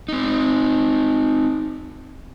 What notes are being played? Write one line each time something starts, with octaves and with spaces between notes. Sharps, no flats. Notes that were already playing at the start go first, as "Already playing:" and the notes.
C4 D#4